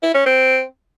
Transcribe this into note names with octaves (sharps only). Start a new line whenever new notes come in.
E4
C#4
C4